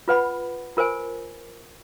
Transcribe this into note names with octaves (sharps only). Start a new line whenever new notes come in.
F4 B4 F#5 B5
F4 A#4 C5 G#5